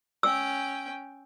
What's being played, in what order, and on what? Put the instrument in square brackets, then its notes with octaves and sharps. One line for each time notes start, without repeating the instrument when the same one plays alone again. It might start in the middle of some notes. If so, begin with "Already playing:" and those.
[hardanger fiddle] C#4 G5 [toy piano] E6